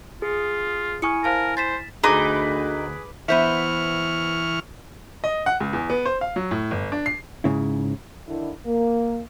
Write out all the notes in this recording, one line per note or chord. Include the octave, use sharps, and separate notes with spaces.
F4 G#4
E4 G#5 C#6 D#6 F6 C#7
A#4 C5 F5 A5
C5 A6 B6 E7
D2 D#4 G#4 B4 B5 D6
E3 B3 C5 E5 C#6 F6
D#5
F#5
C#2
E2
B3
C5
F5
F#3
A2
G1
D4
C7
G#2 C#3 E4
D3 D#3 E4
A#3